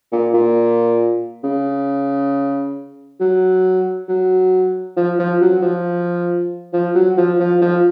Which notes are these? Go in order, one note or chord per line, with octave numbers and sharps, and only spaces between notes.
A#2
A#2
C#3
F#3
F#3
F3
F3
F#3
F3
F3
F#3
F3
F3
F3